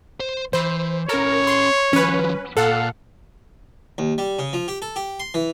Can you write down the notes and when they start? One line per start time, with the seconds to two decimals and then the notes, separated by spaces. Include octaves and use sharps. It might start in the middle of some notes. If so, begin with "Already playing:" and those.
0.20 C5
0.53 E3 C5 B5
1.09 C#4 A4 A#4 C#5
1.47 C6
1.93 D#3 F3 C#4 B4
2.57 A#2 A4 F5 F#5
3.98 D#2
4.18 G3
4.39 C#3
4.53 F3
4.68 G4
4.82 A4
4.96 G4
5.20 C6
5.34 E3